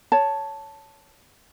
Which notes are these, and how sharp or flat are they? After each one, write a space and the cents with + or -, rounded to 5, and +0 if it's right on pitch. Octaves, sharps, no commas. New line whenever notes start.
C#5 +10 A5 +0